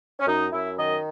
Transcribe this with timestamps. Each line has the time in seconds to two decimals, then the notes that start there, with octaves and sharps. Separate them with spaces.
0.19 C#4
0.27 F#2 D#4
0.52 F#2 E4
0.77 D#3 D#5